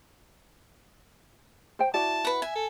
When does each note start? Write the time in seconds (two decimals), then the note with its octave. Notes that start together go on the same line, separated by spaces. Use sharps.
1.79 C5 G5
1.94 E4 F#4 D5 A5
2.25 B4 F#5
2.42 E5 G#5
2.55 A4